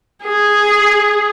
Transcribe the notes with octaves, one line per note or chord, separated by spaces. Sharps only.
G#4